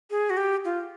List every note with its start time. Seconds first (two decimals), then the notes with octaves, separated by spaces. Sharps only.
0.11 G#4
0.30 F#4
0.37 G4
0.65 F4